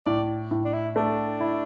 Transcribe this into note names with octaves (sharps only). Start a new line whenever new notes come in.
A2 D5
A2
D4
E4
A3 D4
E4